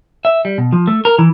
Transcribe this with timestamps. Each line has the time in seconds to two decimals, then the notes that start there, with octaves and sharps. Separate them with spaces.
0.25 E5
0.45 G3
0.58 B2
0.73 F3
0.87 A3
1.05 A#4
1.19 E3